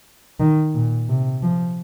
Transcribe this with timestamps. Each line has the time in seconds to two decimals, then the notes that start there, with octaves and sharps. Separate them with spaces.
0.40 D#3
0.74 A#2
1.09 C3
1.43 F3